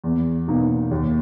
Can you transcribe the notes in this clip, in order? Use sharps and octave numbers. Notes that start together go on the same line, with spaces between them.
E2
B2 A#3 D#4
D#2